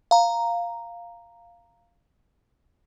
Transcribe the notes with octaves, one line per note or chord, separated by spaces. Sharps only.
F5 A#5